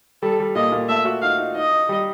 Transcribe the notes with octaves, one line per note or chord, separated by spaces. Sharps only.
G3 A4
G3
A#2 D#5
A#2
A3 E5
F#4
D#4 F5
D#4
D#4 D#5
D#4
G3